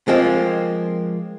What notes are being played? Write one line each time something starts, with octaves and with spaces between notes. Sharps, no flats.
F3 G#3 A#3 C4 F4